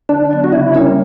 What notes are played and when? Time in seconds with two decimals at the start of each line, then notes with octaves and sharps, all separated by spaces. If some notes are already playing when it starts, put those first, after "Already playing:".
0.09 D3 D4
0.31 F#3 B3
0.44 F#4
0.53 C#3 E4
0.74 G3 A#3 C#4 D4 A#4